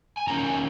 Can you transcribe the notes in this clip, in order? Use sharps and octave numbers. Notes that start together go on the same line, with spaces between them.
G#5
E2 D#3 A#3 C#4 A#5
A#5
G#5